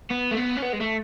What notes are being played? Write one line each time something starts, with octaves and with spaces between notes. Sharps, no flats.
B3
A3
B3
C#4
B3
G#3
A3